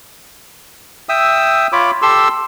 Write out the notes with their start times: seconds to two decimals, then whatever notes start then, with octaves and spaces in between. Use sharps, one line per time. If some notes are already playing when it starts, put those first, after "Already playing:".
1.09 E5 G5 D#6 E6
1.72 F4 C#5 B5 D6
2.02 G4 A4 C6 E6